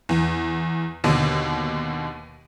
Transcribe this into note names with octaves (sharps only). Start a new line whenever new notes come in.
E2
D#2 B2 D3